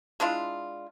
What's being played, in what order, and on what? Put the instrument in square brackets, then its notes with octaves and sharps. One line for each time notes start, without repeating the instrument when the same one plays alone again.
[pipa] G#3 D4 E4 F4